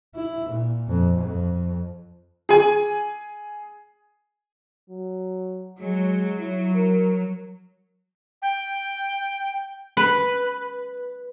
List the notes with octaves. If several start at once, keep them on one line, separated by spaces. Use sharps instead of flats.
E4
A#2
F2
F2
G#4 G#5
F#3
F#3 G#3
E4
A#4
G5
B4